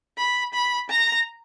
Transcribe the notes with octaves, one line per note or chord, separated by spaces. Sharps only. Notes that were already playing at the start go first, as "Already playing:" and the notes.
B5
B5
A#5